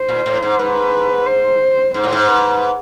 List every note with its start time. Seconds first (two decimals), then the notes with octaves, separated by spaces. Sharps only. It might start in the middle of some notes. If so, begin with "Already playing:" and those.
Already playing: C5
0.08 A#2
0.26 A2
0.43 G#2
0.59 G#2 B4
1.26 C5
1.94 G#2 C5
2.04 A2
2.13 G#2
2.28 B4